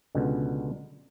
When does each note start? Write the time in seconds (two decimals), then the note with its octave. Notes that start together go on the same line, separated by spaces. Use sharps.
0.15 C#2 B2 D3